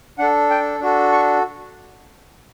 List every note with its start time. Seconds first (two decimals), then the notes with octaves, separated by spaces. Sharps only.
0.18 D4 A4 F#5
0.50 G5
0.80 D4 F#4 A4
1.12 C#6